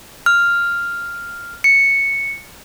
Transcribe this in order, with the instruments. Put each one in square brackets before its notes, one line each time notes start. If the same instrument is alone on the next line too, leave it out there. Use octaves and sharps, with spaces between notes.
[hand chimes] F6
C#7